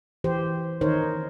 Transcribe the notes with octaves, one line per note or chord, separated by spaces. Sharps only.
E3 G4 C5
D#3 D#4 A#4 C5 C#5